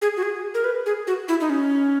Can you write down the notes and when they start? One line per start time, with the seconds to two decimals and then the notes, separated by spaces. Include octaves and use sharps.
0.02 G#4
0.17 F#4
0.23 G#4
0.54 A#4
0.64 B4
0.86 G#4
1.07 F#4
1.28 E4
1.41 D#4
1.50 C#4